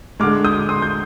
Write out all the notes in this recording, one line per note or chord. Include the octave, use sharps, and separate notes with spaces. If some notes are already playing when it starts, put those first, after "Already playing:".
D3 G#3 D6 F6
D#6 G6
C6 D#6
G6